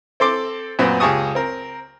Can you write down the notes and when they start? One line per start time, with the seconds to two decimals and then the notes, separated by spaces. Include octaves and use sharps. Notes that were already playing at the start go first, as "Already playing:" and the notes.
0.20 C4 A4 C6 D6
0.79 F#2 A#2 B3 C4 F#4
1.00 C#2 G4 G#4 A5 C#6 D#6
1.35 C4 A#4